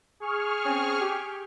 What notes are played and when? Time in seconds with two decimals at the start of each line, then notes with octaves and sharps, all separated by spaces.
0.20 G#4 C#6 F6
0.65 C4 C#4
1.00 G4